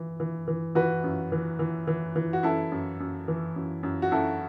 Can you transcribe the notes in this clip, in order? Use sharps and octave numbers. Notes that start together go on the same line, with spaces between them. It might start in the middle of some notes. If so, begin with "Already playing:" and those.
Already playing: E3
E3
E3
E3 F#4 B4
F#2
E3
E3
E3
E3
F#4
F#2 E4 A4
F#2
F#2
E3
F#2
F#2
F#4
F#2 E4 A4